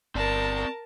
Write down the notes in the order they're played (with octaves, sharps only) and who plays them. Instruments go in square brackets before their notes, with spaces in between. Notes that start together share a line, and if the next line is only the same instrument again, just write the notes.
[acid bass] G1 [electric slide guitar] C4 D5 [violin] A#4 A5